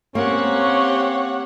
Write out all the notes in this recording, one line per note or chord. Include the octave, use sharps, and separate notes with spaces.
A#3 C4 C#4 G4 C#5 F#5